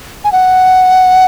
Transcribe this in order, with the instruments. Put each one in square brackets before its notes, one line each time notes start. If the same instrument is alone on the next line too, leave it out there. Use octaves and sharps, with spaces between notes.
[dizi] G#5
F#5